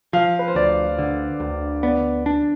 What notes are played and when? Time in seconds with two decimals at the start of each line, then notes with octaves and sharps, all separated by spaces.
0.13 F3 F5
0.39 B4
0.48 C5
0.55 D2 D5
0.99 D3
1.40 D2
1.83 B3 D5
2.26 D4